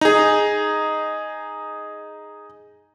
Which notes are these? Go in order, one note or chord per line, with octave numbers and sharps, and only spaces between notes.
D#4 G#4